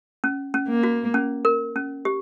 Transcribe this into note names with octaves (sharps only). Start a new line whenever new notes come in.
C#4
C#4
A#3
F#4
C#4
A#4
C#4
G4